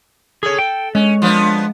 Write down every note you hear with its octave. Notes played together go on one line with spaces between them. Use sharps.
G#4 A4 C#5
G5
G#3 C#4
F3 B3 D4